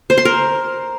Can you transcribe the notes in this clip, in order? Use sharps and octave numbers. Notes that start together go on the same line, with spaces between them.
C5
C6
A#4